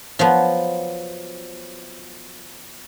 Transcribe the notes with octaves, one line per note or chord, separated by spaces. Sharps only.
F3 F#3 B3